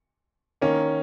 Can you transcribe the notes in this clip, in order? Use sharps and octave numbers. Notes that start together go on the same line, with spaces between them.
D#3 A#3 C#4